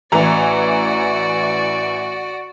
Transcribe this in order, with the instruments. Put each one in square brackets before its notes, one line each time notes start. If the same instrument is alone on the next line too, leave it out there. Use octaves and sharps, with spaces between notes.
[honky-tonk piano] A1 E3 A#5 [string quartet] F#4 D5